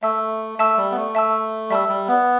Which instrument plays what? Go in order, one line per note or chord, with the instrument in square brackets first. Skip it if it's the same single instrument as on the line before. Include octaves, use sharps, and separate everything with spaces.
[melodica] A3 [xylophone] E5 A5 E6
[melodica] A3 [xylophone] E5 A5 E6
[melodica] G3
B3
A3
[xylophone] E5 A5 E6
[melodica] G3 [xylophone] E5 A5 E6
[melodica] G3
B3